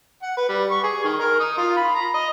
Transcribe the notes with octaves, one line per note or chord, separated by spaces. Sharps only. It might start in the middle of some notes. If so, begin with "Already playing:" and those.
F#5
B4
G3
C#6
G#4
D#3
A#4
D#4
F4
B5
A#5
D#5